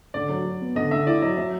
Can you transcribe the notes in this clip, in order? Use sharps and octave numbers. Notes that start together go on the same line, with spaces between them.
D3 D5
F#3
F#3
B3
D3 D#5
D3 E5
E4 D5
F#3 D#5
F#3 E5